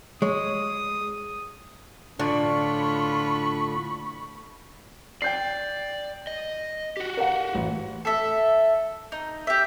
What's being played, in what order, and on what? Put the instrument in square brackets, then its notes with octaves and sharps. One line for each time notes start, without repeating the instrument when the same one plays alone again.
[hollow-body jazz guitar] G#3 [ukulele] C#5 [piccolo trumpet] D#6
[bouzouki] A2 D3 [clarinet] D4 [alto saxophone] F4 [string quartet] B5 C#6
[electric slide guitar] D5 [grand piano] G5 G6 C7
[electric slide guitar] D#5
F#4 G4
[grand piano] A#4 F5 F#5
A1
[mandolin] A4 E5
D#4
G4 E5